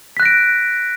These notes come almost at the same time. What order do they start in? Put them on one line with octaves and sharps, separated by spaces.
B6 F#6 A#6 D7